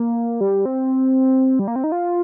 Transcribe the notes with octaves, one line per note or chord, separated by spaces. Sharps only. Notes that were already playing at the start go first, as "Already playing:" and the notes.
Already playing: A#3
G3
C4
G3
A#3
C4
D#4
F4